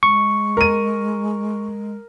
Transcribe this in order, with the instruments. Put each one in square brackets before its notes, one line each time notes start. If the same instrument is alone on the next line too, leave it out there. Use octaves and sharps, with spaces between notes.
[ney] G#3 [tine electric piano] C#6
[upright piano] A#4 D#7